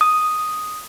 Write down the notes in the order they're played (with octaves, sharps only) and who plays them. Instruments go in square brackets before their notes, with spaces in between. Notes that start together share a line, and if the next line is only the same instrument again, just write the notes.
[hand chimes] D#6